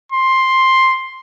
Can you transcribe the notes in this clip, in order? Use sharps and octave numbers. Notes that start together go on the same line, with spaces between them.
C6